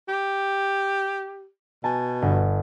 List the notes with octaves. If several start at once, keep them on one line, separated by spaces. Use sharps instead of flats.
G4
B2 G#5 A5
G1